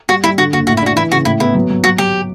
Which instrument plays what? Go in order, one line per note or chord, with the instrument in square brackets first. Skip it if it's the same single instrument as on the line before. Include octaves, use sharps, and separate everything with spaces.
[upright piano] G3 [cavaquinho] F#4
[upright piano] G3 [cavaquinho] E4
[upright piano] D3 [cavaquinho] F#4
[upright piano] F#1 [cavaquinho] F#4
[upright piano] A2 [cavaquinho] F#4
[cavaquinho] E4
[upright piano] D4 [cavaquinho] F#4
[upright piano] E3 [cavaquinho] E4
[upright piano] C#3 [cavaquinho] F#4
[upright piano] A2 [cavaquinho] E4
[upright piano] B3 [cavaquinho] E4
[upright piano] F#3
F#3
[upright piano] F#3 [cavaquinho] F#4
[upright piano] F#3 [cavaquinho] G4